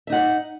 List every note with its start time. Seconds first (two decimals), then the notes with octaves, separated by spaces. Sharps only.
0.07 E5
0.10 D#4
0.12 F#5